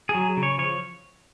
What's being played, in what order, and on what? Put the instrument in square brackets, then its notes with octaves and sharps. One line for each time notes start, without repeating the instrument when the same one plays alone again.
[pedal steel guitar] G#4
F#3
C#3
C#5
F3 C#5